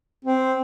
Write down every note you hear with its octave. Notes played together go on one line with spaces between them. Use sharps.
C4